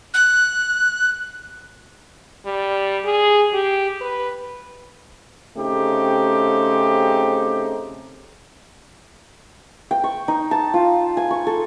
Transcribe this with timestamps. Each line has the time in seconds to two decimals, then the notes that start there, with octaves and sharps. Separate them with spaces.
0.14 F#6
2.46 G3
3.05 G#4
3.53 G4
4.01 B4
5.57 C#3 A3 C4 D#4 G4
9.91 G5
10.04 C#6
10.28 D#4
10.51 A5
10.74 F4
11.17 G#5
11.31 C#6
11.47 A4